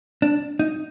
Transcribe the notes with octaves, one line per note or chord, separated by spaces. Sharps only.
D4
D#4